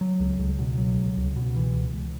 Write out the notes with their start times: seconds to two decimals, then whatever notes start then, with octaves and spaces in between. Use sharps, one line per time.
0.01 F#3
0.20 C#2
0.39 C#2
0.59 B2
0.78 F#3
0.98 C#2
1.17 C#2
1.36 B2
1.56 E3
1.75 C#2
1.94 C#2